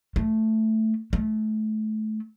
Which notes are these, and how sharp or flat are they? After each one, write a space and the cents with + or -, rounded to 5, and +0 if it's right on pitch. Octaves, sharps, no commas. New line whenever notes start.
A3 +0
A3 -25